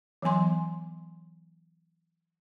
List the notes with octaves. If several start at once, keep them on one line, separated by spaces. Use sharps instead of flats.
E3 F#3 B3 G#5 C6